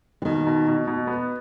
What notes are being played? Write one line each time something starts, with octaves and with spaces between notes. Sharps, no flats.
E3
B2 D#3
B2
B2
B2
B3